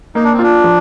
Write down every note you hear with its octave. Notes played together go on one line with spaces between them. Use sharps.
A#3 D#4
D4
C4
D4 F4
F3